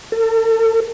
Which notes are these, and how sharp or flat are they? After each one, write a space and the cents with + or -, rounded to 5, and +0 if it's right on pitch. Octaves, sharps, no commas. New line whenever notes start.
A4 +40